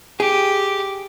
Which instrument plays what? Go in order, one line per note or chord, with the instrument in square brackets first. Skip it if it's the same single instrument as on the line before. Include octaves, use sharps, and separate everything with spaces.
[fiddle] G4 [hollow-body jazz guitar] G#4